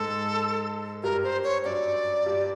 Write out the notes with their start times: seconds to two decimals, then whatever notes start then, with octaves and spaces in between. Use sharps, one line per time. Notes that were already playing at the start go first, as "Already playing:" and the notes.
Already playing: G#2 G#3 A4
1.03 G2 G3 A#4
1.24 C5
1.44 C#5
1.65 F#2 F#3 D5
2.26 G2 G3